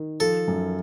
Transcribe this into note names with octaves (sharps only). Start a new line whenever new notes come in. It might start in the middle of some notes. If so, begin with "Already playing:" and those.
Already playing: D#3
F3 A4
F#2